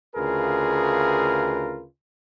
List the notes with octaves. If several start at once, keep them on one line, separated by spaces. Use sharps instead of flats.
D2 C#3 F4 G#4 A#4 B4